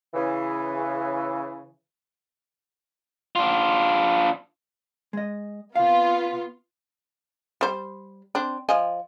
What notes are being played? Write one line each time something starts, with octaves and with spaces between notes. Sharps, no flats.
C#3 E3
D4 F4
G#3 D#5
C3 B3 F4 F5
G3 C5
C4 D4
F3 D#5 G#5